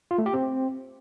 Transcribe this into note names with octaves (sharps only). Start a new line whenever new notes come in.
F4
A3
G4
C4